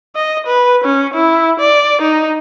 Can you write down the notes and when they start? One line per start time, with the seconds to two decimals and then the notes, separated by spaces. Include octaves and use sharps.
0.16 D#5
0.46 B4
0.84 C#4
1.14 E4
1.60 D5
2.02 D#4